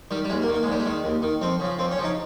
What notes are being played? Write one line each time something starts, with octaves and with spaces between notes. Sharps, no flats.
D#3 G3
G3
D#2 G#3
A#3
D#3
A#3
G#3
D#2 G3
G#3
D#3
D#2
D#3
F2 C4
C#3 F3
F2 C4
C#4
C#3 F3
D#4